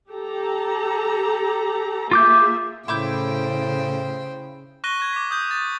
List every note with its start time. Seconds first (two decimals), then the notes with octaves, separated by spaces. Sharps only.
0.10 G4 A4 A#5
2.11 A#3 F4 G#4 E5 D6 G6
2.88 A2 C#3 E4 C5 G5 D6 G6
4.84 C#6 F#6 A#6 D#7 G7
5.00 C#6 G#6
5.13 D6 B6
5.31 D#6 G6
5.51 A6